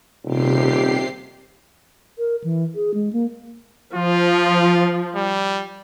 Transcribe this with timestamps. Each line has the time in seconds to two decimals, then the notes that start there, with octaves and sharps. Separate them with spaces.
0.24 D#1 C3 G4 C7
2.17 A#4
2.44 E3
2.75 G#4
2.94 G#3
3.13 A#3
3.94 F3 F4
5.16 G3